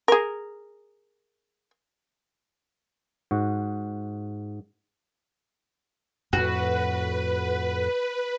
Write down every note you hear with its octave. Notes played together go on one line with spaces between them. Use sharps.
G#4 A#4
G#2 F#4
F2 A2 F#4 B4